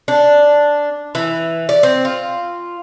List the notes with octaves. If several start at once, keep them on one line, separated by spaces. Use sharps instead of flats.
D4
E3
D5
C4
F4